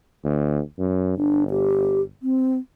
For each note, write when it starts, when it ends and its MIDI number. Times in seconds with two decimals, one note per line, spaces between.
0.25 0.60 38
0.79 1.15 42
1.17 2.12 31
1.17 1.44 62
1.51 2.02 67
2.23 2.57 60